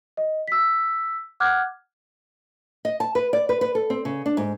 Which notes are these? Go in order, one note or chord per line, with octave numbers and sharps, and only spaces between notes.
D#5
E6 B6
F#5 D6 F6 F#6 G#6
D#5
A5
B4
D5
B4
B4
A4
C4
C#3
D4
G#2